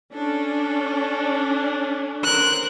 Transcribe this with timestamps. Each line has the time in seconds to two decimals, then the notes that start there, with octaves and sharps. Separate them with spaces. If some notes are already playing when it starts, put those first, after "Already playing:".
0.13 C#4 D4 A4
2.24 A#4 C5 F#6